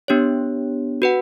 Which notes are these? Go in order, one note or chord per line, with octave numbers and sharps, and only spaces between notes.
B3 D4 G4 C#5
F#4 B4 F#5